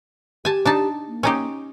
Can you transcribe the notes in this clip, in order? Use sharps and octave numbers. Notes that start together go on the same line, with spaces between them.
G4 G#5 A5
D4 D#4 A5
A#3
C#4 D#4 G4